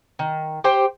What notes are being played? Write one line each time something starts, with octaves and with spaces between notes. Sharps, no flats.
D#3
G4 C5 G5